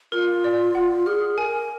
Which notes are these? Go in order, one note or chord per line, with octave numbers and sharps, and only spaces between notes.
F4 A#4
D5
F#5
G#4 F6
A#4 G#5